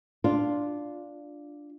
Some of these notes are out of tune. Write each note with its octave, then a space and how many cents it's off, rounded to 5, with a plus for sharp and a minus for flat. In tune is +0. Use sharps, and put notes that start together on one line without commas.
D4 +0 F4 +0